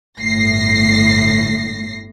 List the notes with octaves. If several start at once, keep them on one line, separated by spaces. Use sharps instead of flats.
G1 A2 A#6 C7